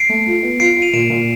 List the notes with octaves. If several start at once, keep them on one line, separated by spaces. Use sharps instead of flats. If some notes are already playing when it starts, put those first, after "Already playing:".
Already playing: C7 D7
A3
F4
B3
F4 C7 D7
F4
D#7 F7
A#2 D7 E7
A#2